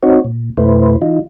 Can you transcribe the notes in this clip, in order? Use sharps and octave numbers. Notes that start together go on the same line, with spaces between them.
C4 D#4 F#4 C#5
A#2
F2 B2 A3 E4 B4 C5
E3 D#4 F4